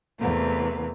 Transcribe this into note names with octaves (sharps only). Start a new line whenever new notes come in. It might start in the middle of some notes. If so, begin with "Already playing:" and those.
E2 C3 A3 A#3 B4